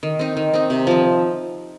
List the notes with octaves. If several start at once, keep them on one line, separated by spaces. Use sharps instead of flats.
D#3
C4 D#4
D#3
C4 D#4
C3
F3 C4